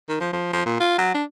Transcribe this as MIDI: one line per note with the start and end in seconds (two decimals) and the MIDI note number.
0.09 0.16 51
0.20 0.33 53
0.33 0.49 53
0.53 0.61 53
0.66 0.80 46
0.80 0.97 65
0.98 1.13 54
1.14 1.24 62